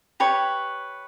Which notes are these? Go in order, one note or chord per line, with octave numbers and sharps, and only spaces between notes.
G4 B4 C#5